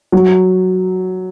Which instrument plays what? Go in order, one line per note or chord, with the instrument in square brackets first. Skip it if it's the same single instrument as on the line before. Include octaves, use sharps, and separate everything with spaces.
[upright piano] F#3